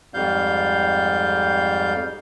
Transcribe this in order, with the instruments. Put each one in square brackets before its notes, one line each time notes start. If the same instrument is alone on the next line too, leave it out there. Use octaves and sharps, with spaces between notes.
[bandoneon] F2 G#2 G3 F5 G6